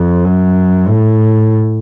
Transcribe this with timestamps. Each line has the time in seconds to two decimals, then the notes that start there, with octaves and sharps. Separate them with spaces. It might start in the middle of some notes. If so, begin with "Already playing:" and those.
Already playing: F2
0.25 F#2
0.88 A2